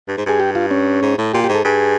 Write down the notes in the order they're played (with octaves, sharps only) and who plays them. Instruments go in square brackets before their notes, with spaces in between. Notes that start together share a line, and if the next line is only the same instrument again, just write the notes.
[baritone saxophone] G2
G#2
[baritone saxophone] G2 [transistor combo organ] G#4
[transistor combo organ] G4
F4
C#4
[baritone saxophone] G#2
A2
[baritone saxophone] A#2 [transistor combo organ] G4
[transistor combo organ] G4
[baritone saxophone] G#2
[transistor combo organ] A4
[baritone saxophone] G2 [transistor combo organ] G#4